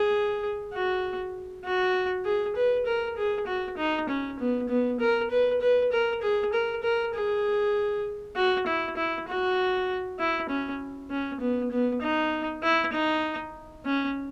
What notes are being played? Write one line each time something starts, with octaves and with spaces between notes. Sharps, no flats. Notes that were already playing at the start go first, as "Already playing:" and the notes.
Already playing: G#4
F#4
F#4
G#4
B4
A#4
G#4
F#4
D#4
C#4
B3
B3
A#4
B4
B4
A#4
G#4
A#4
A#4
G#4
F#4
E4
E4
F#4
E4
C#4
C#4
B3
B3
D#4
E4
D#4
C#4